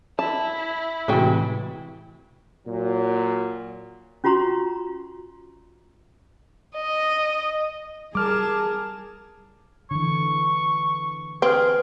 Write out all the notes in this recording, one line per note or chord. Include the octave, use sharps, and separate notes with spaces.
E4 A5
A2 C3 E3 G#3 F#4 G5
A#2 F#3
C#4 F4 F#4 A#5 C6 C#6
D#5
G3 G#4 A#4 A5 D6 F6
D3 E3 C#6
C4 G#4 B4 F6